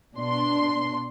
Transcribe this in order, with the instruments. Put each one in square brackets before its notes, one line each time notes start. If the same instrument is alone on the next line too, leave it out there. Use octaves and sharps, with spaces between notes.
[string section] B2 D4 C6